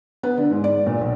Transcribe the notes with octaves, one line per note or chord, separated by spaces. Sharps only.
B3
D3
G#2
D5
A#2
B1